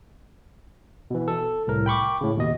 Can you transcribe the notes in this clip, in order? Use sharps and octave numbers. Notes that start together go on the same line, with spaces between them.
B2 E3
A4
C2 A2 A#4
G5 B5 C#6 D6
A2 C#3
D#2 B2 D#5